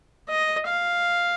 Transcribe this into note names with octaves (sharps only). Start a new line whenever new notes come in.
D#5
F5